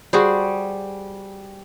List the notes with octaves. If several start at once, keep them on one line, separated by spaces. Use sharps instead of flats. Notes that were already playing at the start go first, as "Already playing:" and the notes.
G3 F#4 G#4 C5